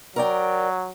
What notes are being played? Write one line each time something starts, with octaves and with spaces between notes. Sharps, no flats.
F#3 A#4 D5 G5